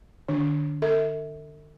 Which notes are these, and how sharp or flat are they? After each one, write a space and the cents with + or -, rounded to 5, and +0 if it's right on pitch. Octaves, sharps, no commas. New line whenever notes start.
D3 +40 D4 -30
A4 +40 E5 -30